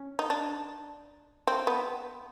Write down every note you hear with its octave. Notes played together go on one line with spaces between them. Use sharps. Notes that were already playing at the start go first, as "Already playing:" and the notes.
Already playing: C#4
D#4
D4
C4
B3